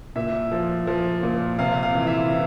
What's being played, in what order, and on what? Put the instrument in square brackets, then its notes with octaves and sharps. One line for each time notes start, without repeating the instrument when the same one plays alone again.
[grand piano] A#2 E5
F3
F3
A#2
C3 F5
F5
E3
E5
E3